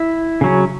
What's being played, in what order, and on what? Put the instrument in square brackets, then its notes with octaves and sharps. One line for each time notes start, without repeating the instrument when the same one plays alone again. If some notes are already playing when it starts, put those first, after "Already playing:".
Already playing: [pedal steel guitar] E4
C#3 F#3 C#4